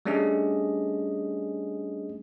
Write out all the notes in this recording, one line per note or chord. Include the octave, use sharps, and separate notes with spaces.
G3 A3 C#4 D4 G#4 D#5